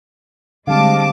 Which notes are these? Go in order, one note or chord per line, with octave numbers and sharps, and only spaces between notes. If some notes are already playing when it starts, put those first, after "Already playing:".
D3 G3 G#3 C4 F5 A5 D6